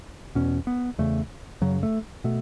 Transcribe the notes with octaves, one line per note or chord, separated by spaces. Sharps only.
E2 B2 C#4
B3
E2 C#3 A3
F#2 C#3 F#3
A3
B2 A3